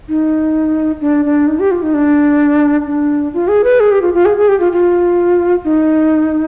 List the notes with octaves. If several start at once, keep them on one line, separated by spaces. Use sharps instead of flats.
D#4
D4
D4
D#4
G4
F4
D#4
D4
D4
F4
G#4
B4
G#4
G4
F4
F4
G#4
G#4
G4
F4
F4
D#4